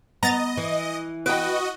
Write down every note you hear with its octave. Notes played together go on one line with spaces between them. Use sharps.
B3 D#5 A#5 A6 A#6
E3
F#4 B4 D#5 G5 D7